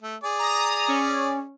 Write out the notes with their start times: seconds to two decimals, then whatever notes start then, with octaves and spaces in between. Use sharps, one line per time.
0.02 A3
0.23 G#4 D5
0.39 A#5 D#6
0.88 C#4